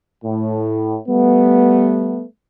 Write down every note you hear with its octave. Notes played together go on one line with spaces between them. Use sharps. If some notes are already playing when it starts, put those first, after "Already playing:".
A2
G3 A3 B3